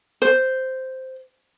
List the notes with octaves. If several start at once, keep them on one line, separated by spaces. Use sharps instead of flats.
C5